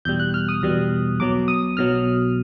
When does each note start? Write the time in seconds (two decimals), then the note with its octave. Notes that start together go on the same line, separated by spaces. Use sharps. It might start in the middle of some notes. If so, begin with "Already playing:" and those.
0.05 E2 B2 G3 G6
0.20 F#6
0.34 F6
0.49 D#6
0.62 E2 B2 G3
1.20 B1 B2 F#3 D6
1.48 D#6
1.77 B2 F#3 F6